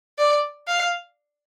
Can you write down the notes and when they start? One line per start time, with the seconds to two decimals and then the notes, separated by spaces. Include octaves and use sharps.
0.18 D5
0.68 F5